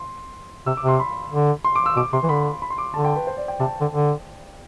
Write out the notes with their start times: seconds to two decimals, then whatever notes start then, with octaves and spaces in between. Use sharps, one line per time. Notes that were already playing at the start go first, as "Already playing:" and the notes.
Already playing: C6
0.66 C3 E6
0.77 D6
0.83 C3
0.88 C6
1.00 B5
1.32 D3
1.64 C6
1.75 D6
1.86 E6
1.96 B2 D6
2.13 C3 C6
2.23 E3
2.29 D3 B5
2.62 B5
2.70 C6
2.78 D6
2.94 D3 A5
3.05 G5
3.16 B4
3.27 C5
3.37 D5
3.48 G5
3.60 C3 A5
3.81 D3
3.92 D3